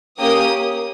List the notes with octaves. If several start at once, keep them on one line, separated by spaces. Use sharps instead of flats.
A#3 C#4 G4 D#6